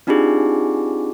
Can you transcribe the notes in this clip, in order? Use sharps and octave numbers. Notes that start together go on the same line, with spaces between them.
C4 D4 D#4 F4 G4 G#4